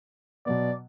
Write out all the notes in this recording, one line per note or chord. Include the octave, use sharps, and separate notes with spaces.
B2 F#3 B3 D5